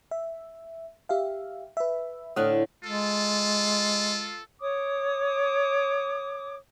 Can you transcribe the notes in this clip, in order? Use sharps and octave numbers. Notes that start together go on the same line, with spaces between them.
E5
G4 E5 F5
B4 E5
A2 D3 D#6 F6 F#6
G#3 F4 A4
C#5 D6 D#6